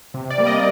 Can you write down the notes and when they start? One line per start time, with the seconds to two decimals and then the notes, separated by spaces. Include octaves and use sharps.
0.14 C3
0.30 D5
0.38 G3 A#3
0.47 D#5